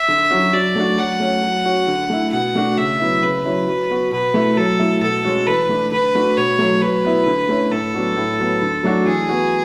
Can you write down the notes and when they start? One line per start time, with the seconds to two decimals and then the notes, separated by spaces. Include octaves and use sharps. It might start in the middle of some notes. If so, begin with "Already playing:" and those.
Already playing: E5
0.08 D3
0.31 F#3 C#4 F#4
0.53 F#3 D5
0.76 A3 D4 F#4
0.98 F#3 F#5
1.20 A3 C#4
1.43 F#3
1.65 C#4 F#4
1.87 D3
2.10 A3 E4
2.32 B2 F#5
2.55 A3 D4 F#4
2.77 C#3 E5
3.00 F#3 B3 E4
3.22 C#3 B4
3.44 F#3 C#4 E4
3.68 F#3
3.90 B3 F#4
4.12 B2 B4
4.34 A3 E4
4.57 F#3 A4
4.79 A3 E4
5.01 B2 A4
5.25 G#3 C#4 F#4
5.47 E3 B4
5.69 A3 D4
5.92 D3 B4
6.15 A3 D4 F#4
6.37 B2 C#5
6.59 F#3 A3
6.82 F#3 B4
7.05 B3 E4
7.26 D3
7.49 A3 C#4 E4
7.71 A2 A4
7.94 F#3 B3 D4 F#4
8.17 A2
8.39 F#3 B3
8.62 D3
8.83 F#3 A3 D4 F#4
9.06 E3 G#4
9.29 B3 F#4